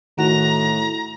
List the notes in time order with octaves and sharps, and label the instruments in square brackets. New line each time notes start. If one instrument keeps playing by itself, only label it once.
[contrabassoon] A2 [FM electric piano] D#3 F#4 [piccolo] A#5